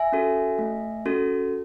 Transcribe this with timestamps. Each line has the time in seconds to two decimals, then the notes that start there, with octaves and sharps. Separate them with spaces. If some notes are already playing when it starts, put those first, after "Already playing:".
Already playing: E5 G#5
0.12 C#4 F#4 A4
0.59 A3
1.06 C#4 F#4 A4